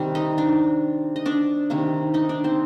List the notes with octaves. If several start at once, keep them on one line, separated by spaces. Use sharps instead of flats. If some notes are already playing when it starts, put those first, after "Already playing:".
Already playing: C3 D#3 G3
D#4 D#5
D4 D5
D#5
D4 D5
C3 D#3 A#3
D#4 D#5
D4 D5
C4 C5